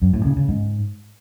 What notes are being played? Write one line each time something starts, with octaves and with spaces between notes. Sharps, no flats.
F#2
A2
C#3
C#3
G#2